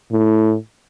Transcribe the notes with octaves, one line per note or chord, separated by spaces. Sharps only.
A2